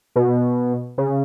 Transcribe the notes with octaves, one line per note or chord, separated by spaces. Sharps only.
B2
C#3